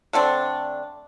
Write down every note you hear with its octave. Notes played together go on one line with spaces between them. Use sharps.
D3 A3 C4 D4